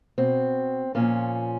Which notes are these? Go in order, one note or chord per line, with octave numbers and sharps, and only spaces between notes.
B2 C4
A#2 F3 C#4